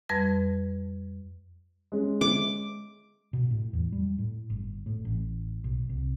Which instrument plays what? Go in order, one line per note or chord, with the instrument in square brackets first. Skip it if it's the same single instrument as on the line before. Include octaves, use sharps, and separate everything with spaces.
[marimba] F2 G3 B4 G#6
[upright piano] G#3 C#4
[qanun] D6
[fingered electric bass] B2
A2
E2
G3
A2
G1
A2
A1
B1
C2